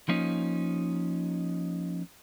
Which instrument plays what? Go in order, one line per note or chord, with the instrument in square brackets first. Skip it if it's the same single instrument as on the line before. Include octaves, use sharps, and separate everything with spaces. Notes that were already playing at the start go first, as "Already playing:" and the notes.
[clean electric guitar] F3 A#3 C#4 D#4